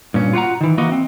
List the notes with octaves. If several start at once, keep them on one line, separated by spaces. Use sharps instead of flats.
G2 A#2 C#4
F4 F#4 F#5 A#5
D#3 E3
E3 A#3 F#4 D#5
C4